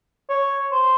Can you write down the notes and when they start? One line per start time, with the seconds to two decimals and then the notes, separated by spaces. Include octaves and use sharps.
0.30 C#5
0.71 C5